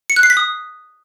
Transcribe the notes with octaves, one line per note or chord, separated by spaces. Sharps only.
C#7
F#6
C7
B6
D#6